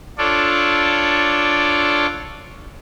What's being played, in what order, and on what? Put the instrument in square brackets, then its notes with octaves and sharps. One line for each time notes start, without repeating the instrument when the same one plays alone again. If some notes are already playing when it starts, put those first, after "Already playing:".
[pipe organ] D4 F4 A4 C#5 D5